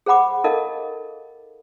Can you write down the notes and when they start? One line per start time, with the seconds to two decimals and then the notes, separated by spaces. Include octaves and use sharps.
0.06 G#4 C5 F#5 B5 D6
0.44 D#4 A4 A#4 D#5 F5